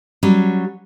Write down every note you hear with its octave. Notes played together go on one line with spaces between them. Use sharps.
F#3 G3 C#4